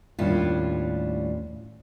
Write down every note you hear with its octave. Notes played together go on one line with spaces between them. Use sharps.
D#2 A2 G3 C#4 D4 F4